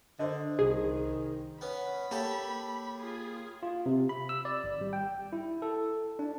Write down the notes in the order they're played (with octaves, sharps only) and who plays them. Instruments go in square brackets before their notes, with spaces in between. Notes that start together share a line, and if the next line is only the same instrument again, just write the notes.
[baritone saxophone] D3 [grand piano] C5 D#5
[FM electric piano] C2 [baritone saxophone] D#3 [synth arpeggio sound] G#4
[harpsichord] B3 C#4 [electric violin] B5
[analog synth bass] A#3 [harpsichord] G4 A4 C#5
[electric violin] F4 G#4
[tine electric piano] F4
C3
B5
E6
D5
G#1
G3
G5
E4
A4
D4